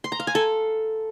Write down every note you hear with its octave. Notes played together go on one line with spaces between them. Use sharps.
C6
A#5
F5
G#5
A4